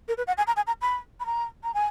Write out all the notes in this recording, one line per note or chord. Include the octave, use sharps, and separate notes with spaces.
A#4
B4
F#5
G#5
A#5
G#5
A#5
B5
B5
A#5
A#5
G#5